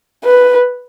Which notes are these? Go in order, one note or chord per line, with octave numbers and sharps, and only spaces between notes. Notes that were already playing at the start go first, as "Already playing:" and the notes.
B4